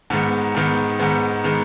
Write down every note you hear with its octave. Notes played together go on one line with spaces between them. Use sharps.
G#2 D#3 G#3 B3
G#2 D#3 G#3 B3
G#2 D#3 G#3 B3
D#3 G#3 B3